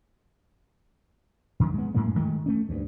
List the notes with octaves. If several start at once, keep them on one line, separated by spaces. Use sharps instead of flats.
F#2 D#3 F#3
G#3 B3
F#2 A2 G#3 A#3
D#3 G#3 A3
A3 C#4
D2 G2